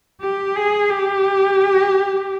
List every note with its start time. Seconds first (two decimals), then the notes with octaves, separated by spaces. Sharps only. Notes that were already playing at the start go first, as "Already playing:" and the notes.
0.21 G4
0.56 G#4
0.90 G4